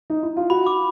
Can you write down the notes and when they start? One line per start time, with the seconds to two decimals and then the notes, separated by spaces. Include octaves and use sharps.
0.10 D#4
0.23 E4
0.37 F4
0.50 F#4 B5
0.67 D6